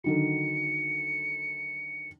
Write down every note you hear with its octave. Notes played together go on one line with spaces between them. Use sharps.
D3 D#3 F#3 C#7